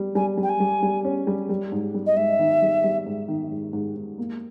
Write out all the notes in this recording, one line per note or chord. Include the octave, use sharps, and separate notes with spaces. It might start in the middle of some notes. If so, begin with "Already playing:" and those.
Already playing: G3
G3 G#5
G3
G5
G#5
G3
G3
C#4
G3
G3
G#2
G3
D#5
G#2 E5
D#3
G3
G3
G#2
D#3
G#2
G#2
G#2
A#3